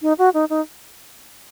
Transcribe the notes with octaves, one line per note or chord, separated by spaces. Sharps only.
D#4
F#4
D#4
D#4